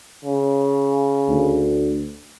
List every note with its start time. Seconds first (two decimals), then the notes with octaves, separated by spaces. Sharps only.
0.25 C#3
1.29 D2